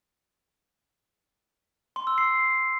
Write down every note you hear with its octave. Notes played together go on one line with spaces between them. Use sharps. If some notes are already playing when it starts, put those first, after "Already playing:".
C6
E6
C7